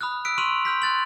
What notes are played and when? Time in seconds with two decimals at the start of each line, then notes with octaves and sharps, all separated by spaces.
0.01 B5 D#6 F6 F#6
0.25 E6 F#6 B6 D7
0.38 C6 C#6 F6 D#7 F7 F#7
0.65 C6 F6 G6 B6
0.82 C6 F#6 A6 F#7